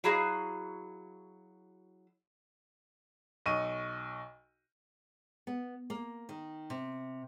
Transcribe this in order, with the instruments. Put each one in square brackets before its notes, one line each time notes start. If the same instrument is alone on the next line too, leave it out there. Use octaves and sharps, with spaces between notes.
[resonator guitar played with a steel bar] F#3 E4 F#4 G#4 F5
[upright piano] B1 D#5 C#6 D#7
[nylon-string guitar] B3
A#3
D#3
C3